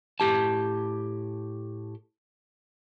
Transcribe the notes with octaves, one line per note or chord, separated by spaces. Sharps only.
A2 G4 A5